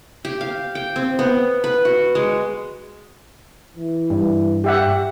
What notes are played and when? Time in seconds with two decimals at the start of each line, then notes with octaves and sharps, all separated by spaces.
0.25 G4
0.41 F5
0.75 G5
0.96 C4
1.19 B3
1.64 B4
1.85 F#4
2.15 G#3
3.77 E3
4.10 G2
4.64 G4 E5 F#5